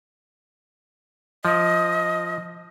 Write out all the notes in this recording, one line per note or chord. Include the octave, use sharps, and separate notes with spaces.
F3 D#5